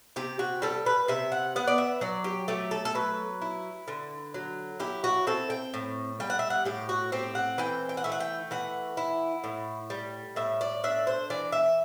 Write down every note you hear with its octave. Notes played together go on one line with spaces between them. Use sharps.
C3 G4
F#4
G3 A4
B4
C3 E5
F#5
B3 F#5
D5
E5
F#3 D5
G4
A3 G4
A4
A4
F#3 B4
E4
D3
F#3
E4 G4
F#4
C4 A4
G5
A2
G3 G5
F#5
E5
F#5
A2 G4
F#4
C4 G4
F#5
E3 G5
G5
F#5
A3 E5
F#5
G5
E3 F#5
E4
A2
G3
A2 E5
D5
D4 E5
C5
E3 D5
E5